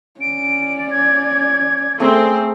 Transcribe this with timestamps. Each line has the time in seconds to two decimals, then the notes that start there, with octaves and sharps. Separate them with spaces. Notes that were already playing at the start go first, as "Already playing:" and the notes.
0.21 C#4 D5 D7
0.91 G#6
2.00 A3 C4 G#4 A#5